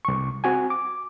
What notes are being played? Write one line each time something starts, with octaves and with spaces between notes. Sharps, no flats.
C2 C#6
C4 F#4 G#5
D6